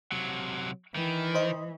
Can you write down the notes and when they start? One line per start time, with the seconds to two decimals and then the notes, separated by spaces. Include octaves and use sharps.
0.12 C3 F#3
0.96 D#3 E3
1.35 C5 D#5